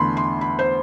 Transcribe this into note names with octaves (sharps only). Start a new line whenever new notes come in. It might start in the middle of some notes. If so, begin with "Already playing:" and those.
Already playing: E2 D3 A3 B5 C6
C6
B5
C5